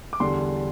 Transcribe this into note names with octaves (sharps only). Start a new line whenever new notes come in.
D6
E2 D3 G3 D4 C6